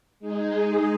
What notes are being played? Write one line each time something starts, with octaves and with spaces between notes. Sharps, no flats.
G#3 D#4 G#4